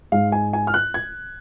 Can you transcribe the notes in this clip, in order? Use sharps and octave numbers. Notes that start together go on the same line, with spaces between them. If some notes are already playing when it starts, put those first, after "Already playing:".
G#2 G#3 F5
G#5
G#5
F6
F#6
G#6